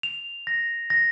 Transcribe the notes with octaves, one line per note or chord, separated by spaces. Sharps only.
F7
A#6
A#6